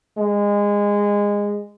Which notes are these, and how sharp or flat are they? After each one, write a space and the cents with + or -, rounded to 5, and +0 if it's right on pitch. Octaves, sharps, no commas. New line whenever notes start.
G#3 -20